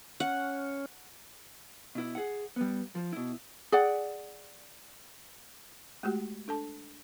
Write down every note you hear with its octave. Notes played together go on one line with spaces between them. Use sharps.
C#4 F#5
B2 E4
G#4 F#5
G3 B3
F3
B2 E4
G#4 D5 F#5
G#3 A3 F#4 G4
D4 A4 A5